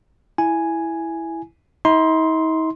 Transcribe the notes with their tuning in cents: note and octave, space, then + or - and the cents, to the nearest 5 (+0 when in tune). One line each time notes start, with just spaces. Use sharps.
E4 +0 G#5 +0
D#4 +45 C6 +0